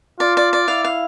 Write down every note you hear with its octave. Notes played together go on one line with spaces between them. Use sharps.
F4 D5
D5
D5
E4 F5
F5